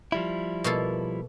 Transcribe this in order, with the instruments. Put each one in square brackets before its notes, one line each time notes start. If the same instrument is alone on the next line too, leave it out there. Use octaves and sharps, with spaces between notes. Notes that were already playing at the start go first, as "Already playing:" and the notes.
[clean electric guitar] F3 G3 E4
[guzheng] B2 A#3 A4